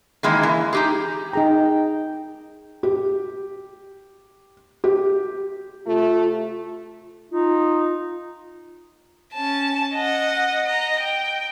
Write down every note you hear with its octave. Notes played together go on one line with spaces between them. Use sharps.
D#3 E3 G#3 A#3 E4
E3
D#4 G4 G#4
D#4 G#4 G5 A#5
G4
G4
C3 A3 F4
D#4 F4
C#4 A5
D#5 F#5
D#5 A#5
G5